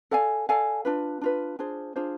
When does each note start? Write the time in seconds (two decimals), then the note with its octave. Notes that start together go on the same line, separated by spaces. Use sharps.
0.11 A4 D5 F5 G#5
0.49 A4 D5 F5 G#5
0.85 D4 F4 B4
1.21 D4 F4 B4
1.59 D4 F4 G#4 C5
1.96 D4 F4 G#4 C5